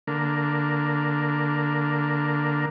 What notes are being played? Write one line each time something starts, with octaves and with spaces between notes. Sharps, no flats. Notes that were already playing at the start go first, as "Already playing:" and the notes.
D3 A#3